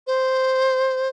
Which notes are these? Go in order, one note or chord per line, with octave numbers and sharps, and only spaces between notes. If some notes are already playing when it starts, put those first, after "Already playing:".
C5